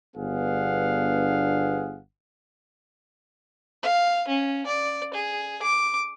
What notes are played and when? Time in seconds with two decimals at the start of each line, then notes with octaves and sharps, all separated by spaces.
0.16 G1 B3 D4 G#4 F5 F#5
3.83 F5
4.28 C#4
4.66 D5
5.14 G#4
5.62 D6